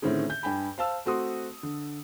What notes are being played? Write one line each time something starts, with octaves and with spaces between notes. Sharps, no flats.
A2 D3 D#3 C4 C#4 G#4
G6
G2 G5 G#5 B5
C5 F5 A5 E6
A3 C4 F#4 C6 D#6
D3